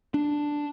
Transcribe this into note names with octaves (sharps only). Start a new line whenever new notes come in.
D4